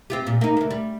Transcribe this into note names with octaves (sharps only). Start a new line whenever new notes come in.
C4 F4 G4
A#2
A#3 D#4
D2 A#3
G3